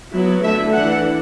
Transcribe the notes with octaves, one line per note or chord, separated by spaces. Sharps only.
F#3 B3 E4
D3 A3 E4 E5
E3 A3 D4 F#5